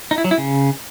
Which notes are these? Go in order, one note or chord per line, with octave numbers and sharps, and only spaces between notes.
D#4
E4
F#3
E4
C#3